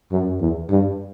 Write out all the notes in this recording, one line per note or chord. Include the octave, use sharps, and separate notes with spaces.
F#2
E2
G2